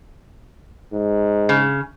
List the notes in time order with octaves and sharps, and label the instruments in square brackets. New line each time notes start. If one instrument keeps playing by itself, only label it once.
[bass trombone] G#2
[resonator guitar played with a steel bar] C#3